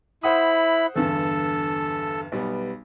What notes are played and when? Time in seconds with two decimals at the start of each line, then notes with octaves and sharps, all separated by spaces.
0.23 E4 C5 F#5 B5 D#6
0.96 E2 G2 D3 A4
2.32 B1 G3 B3